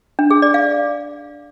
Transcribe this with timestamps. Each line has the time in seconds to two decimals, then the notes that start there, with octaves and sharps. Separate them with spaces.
0.19 D4
0.31 G#4
0.42 D5
0.54 F5